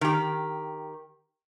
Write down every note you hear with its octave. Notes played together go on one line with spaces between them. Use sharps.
D#3 G4